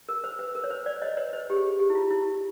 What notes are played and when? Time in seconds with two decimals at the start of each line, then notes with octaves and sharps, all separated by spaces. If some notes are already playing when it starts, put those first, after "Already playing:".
0.09 A#4
0.24 C5
0.39 B4
0.55 A#4
0.64 C#5
0.70 C5
0.86 C5 D5
1.02 C#5 D#5
1.17 B4 C#5
1.33 C5
1.50 G4
1.57 G#4
1.79 G4
1.90 E4
1.95 F4
2.11 E4